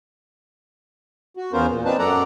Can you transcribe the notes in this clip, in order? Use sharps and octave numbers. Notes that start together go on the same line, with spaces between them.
F#4
E2 B3 C#4 F4 A#4 C5
A#2
C4 D4 D#4 B4 A5
F#2 F#3 A4 D5 F#5 A#5